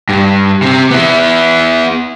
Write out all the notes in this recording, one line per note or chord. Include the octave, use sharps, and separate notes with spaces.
G2
C3 C4
B3 E4